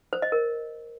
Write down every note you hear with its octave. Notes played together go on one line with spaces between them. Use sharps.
C5
D#5
A#4